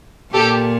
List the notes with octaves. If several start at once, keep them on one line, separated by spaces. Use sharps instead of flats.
A#2 G4 A4